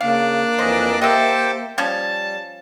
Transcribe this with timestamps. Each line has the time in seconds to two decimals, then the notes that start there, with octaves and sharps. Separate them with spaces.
0.01 C#3 A#3 D4 F5
0.59 F2 E3 C5 D#5
1.01 G4 A4 C5 D#5 E5 G5
1.78 F3 G3 C#4 C#5 A5